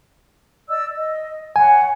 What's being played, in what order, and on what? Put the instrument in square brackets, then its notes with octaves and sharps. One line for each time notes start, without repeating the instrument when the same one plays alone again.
[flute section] D5 D#5 E6
D#5
[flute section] C#5 F#5 [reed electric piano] G#5